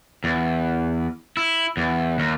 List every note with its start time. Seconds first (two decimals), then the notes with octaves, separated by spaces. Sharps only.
0.24 E2
1.37 E4
1.77 E2
2.19 D#2